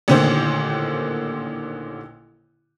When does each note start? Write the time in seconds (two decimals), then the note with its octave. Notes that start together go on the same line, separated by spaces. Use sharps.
0.08 A1 A#2 D3 D#3 C5